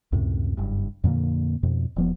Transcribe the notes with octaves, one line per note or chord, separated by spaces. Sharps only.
C#2 F#2 A2 C3
F#1 G2
F2 A#2 D3 A#3
F2 B2
E1 F3 B3